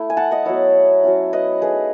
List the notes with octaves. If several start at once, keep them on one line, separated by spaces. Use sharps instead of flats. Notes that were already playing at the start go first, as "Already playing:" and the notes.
Already playing: A3 E4
G#5
F#5 A5
D#5 F#5
F#3 B3 E4 C#5 E5
F#3 C#4 E4
B4 D#5
A3 D#4 G#4 B4